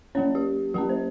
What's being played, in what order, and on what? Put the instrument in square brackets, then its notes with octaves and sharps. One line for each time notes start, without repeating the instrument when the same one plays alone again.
[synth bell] F#3 A#3 C#4 C#5
G4
F#3 A#3 C#4 G4
C5